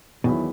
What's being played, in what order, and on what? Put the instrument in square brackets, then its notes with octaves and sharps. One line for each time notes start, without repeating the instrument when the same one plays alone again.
[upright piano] E2 D#3 F#3 B3 E4 [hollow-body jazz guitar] B2